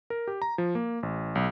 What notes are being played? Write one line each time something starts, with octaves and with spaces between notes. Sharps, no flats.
A#4
G4
A#5
F3
A#3
A1
B1